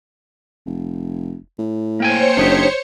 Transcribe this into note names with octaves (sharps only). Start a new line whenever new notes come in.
F1
A2
A#3 C5 C#5 G5 G#5 C#6
F#1 D4 D#4 G4